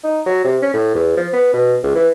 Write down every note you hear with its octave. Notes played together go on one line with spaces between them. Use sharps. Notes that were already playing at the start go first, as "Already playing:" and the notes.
D#4
F#3
C3
C#4
A2
E2
F3
B3
B2
C#2
E3